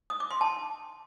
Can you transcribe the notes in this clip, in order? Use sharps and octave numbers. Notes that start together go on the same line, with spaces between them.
D#6
D6
C6
A5